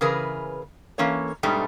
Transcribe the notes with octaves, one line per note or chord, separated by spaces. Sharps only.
C#3 E3 G#4 A#4 B4
E3 A#3 C#4 A4 C#5
G#2 B2 G3 A3 D4